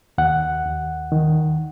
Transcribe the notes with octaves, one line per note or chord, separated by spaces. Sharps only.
D#2 F#5
D#2
D#3